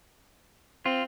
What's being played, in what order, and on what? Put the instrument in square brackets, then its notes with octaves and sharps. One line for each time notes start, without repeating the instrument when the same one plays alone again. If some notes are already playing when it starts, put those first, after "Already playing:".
[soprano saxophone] C4 [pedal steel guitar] F4